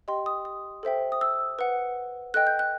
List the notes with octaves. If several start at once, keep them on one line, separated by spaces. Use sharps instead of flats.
G4 D#5 G5 C6
D#6
D#6
A4 C5 E5 G5
D#6
E6
B4 F#5
A4 D#5 G5 F#6
G6
F#6